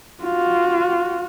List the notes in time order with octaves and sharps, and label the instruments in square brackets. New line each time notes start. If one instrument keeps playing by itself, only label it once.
[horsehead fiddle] F4 F#4